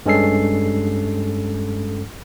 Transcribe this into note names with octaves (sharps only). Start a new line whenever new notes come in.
G2 G#3 C#4 A4 C7